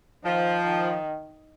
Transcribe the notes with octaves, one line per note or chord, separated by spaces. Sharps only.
D#3 F3
D#3